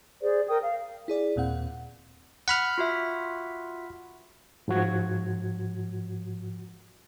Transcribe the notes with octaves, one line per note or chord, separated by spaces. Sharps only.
G#4 C5 D5
A#4 G5 D#6
F5
E4 G#4 D5
D#2 A#2 C4 F#5
F#5 B5 F6
F4 F#4 E5
G#2 F3 F#4 G#6